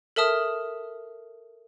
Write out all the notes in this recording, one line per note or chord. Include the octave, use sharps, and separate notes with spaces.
A4 A#4 E5 A5 D#6 F6